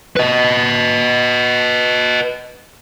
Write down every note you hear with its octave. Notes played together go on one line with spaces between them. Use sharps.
B4 D#5